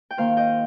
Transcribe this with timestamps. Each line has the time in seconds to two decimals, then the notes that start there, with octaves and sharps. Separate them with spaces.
0.11 G5
0.17 D#3 A#3 F4 C5 F5
0.37 D#5 G5